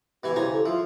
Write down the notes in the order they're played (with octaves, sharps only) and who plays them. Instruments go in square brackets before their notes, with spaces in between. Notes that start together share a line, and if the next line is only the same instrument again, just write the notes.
[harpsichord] B2 E3 G#5 [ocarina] G4
[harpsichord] C#3 G#5 A#5 [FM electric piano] E4 C5
[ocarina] A4
[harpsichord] F3 [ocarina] F4 [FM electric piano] E5 C6